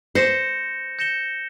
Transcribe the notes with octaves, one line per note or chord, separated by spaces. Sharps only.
C5 G6 A#6 C#7 E7 G7
G6 A#6 C#7 E7 G7